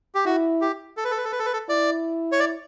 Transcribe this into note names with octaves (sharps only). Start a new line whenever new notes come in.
G4
E4 F#4
G4
A4
B4
A4
B4
A4
B4
A4
B4
A4
E4 D5
C#5
D5